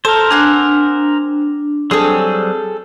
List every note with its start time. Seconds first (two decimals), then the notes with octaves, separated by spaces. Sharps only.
0.05 A4 A#4 C5 A5
0.31 C4 D4 F#5 G#5
1.91 F#3 G3 C4 G#4 A4